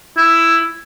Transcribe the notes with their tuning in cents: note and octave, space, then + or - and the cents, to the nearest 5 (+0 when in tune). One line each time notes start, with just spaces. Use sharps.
E4 +5